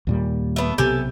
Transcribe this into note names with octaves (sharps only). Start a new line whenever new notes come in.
D#2 A#2 G3
A3 B3
B1 C3 B3 G4 A4 G#5